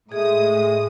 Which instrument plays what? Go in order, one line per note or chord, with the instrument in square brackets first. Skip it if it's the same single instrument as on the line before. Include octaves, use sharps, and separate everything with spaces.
[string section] A2 G#3 D#6 [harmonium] A3 [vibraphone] G#4